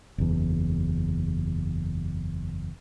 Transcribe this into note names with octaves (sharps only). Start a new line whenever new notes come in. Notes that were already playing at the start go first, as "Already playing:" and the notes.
F#1 E2